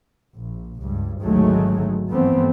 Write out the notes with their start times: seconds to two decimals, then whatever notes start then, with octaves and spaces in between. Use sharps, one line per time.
0.36 A#1
0.81 C#2 G2
1.22 G#1 D2 D#3 F#3 G#3 A3
2.10 G2 E3 F3 A3 B3 C4